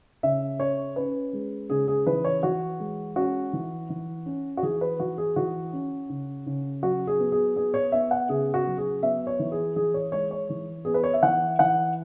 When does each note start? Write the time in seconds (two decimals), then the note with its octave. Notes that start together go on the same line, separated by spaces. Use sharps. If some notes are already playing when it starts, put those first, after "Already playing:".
0.23 C#3 E5
0.60 C#4 C#5
0.96 C#4 B4
1.33 G#3
1.70 C#3 G#4
1.88 G#4
2.06 E3 B4
2.24 C#5
2.43 E3 F#4
2.79 G#3
3.16 C#4 F#4
3.53 E3
3.90 E3
4.26 C#4
4.57 F#4
4.63 E3 G#4
4.81 B4
4.99 E3 F#4
5.18 G#4
5.36 E3 F#4
5.73 C#4
6.09 C#3
6.46 C#3
6.83 F#3 F#4
7.07 G#4
7.19 B3
7.32 G#4
7.56 B3 G#4
7.74 C#5
7.92 B3 E5
8.11 F#5
8.29 C#3 G#4
8.54 F#4
8.66 F#3
8.78 G#4
9.03 B3 E5
9.27 C#5
9.39 E3
9.52 G#4
9.76 E3 G#4
9.94 C#5
10.12 G#3 C#5
10.31 C#5
10.50 E3
10.85 B3 G#4
10.94 B4
11.04 C#5
11.13 E5
11.22 E3 F#5
11.59 E3 F#5